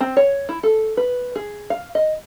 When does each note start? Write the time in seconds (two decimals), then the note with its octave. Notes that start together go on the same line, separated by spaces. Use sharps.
0.01 C4
0.17 C#5
0.49 E4
0.63 A4
0.97 B4
1.36 G#4
1.70 F5
1.95 D#5